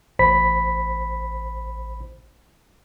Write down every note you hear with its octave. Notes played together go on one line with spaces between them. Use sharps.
A1 C5 B5 B6